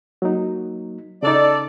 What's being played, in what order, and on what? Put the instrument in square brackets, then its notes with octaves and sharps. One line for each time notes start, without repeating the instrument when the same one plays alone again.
[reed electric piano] F#3 A#3 D#4
[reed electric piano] C#3 D#4 [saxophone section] A4 D5